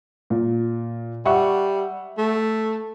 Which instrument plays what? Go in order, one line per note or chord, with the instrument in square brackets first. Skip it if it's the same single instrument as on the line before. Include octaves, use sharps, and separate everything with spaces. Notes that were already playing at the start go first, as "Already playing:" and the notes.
[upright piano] A#2
[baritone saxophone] G3 [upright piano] E5 F#5 C#6
[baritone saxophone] A3